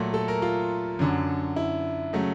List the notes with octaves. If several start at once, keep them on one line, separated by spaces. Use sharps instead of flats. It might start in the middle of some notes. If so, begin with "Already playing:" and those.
Already playing: A#2 F#3 A3
A4
A#4
F4
F#2 D3 F#3
E4
C#3 F#3 A3